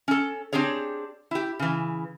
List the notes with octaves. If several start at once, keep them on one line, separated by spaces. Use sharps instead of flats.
C#4 A4
C4 D4 G4 G#4 C#5
E4 G4
C#3 E3